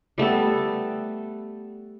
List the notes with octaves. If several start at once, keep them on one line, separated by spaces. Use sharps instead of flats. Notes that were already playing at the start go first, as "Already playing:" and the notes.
G3 A3 B3 A4